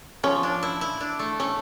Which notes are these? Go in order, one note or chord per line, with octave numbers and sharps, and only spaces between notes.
F3 C#4
D4
E4
E4
D4
A3
A3 C#4